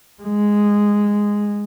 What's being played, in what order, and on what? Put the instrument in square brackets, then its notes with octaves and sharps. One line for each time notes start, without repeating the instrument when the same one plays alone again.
[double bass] G#3